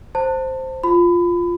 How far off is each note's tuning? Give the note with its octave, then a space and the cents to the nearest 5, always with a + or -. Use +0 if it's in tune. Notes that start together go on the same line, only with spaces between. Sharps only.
C5 +0 A5 +30
F4 +0 B5 +25